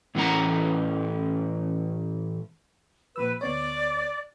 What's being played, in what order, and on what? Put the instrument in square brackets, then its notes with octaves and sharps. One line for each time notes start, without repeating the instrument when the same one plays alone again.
[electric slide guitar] A2 E3 A3 C#4 F#5 A#5
[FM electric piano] A#2 F3 E6 [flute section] B4
[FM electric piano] D2 B3 C#5 [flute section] D5